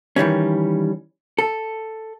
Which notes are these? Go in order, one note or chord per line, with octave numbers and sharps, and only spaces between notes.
D#3 E3 G3 C#4
A4